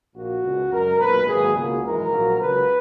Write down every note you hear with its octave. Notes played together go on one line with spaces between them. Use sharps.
A#1 A#2 A#3 F#4
C#2 B2 G#3
F#2 C#3 G#3 A#4
B1 A#2 G#3 B4
G#1 G#2 F#3 A#3 G#4
C#2 B2 A#3
G#1 F#2 E3 G#3 A#4
A#1 G#2 F#3 A#3
C#2 C#3 F#3 B4